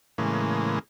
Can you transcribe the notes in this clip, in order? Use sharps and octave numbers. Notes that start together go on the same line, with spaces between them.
A2 C#3 E3 G#3 A#3